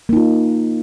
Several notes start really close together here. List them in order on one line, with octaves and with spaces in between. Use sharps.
A#3 D#4 F4